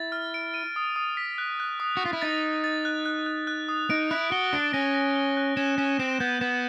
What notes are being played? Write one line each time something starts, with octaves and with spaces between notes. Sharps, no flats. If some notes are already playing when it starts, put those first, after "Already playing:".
Already playing: E4 A6
F6
D7
D#7
D#6
D#6
B6
F#6
F#6
D#6
F#4
F4 F#6
E4
D#4 A6
A6
A6
F#6
F#6
F#6
F#6
D#6
D#4 D7
E4 F#6
F#4 G7
D4 D7
C#4 A#6
A#6
G7
F#6
C#4 E7
C#4 E7
C4 E7
B3 G6
B3 E7